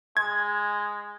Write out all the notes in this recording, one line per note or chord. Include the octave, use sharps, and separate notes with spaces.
G#3 G#6